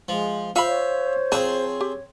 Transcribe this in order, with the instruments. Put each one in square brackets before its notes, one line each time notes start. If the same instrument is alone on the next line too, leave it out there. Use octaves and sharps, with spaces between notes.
[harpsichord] F3 [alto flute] G#3
[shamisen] F4 B5 [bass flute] C5 [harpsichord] E5 F5
[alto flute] C#5
[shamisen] F3 B4 [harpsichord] C4 G#4 A5
[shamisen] G4